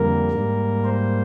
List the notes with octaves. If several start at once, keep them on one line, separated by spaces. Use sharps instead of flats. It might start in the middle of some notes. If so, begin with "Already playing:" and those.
Already playing: F2 D3 G3 A#3 A#4
G#2 G3 A#3
C5